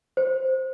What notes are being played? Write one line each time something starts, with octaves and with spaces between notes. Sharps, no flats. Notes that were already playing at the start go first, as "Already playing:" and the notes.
C5